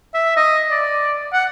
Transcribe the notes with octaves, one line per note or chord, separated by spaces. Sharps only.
E5
D#5
D5
F#5